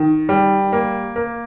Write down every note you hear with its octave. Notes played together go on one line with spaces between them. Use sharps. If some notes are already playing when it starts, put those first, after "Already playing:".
Already playing: D#3
G3
A#3
A#3